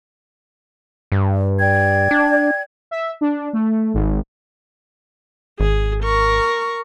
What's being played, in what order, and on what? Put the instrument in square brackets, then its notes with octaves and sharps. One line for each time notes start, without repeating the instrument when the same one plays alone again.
[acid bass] G2
[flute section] D5 G5 G#6
[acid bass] D4
[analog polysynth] E5
D4
A3
G#1
[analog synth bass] G#1 [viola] G#4
[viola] A#4 C#6